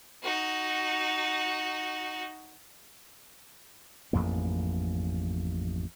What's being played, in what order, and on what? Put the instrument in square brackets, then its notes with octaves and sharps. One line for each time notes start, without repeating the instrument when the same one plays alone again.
[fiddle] D#4 F#4
[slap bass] A1 F2 G#2 A#3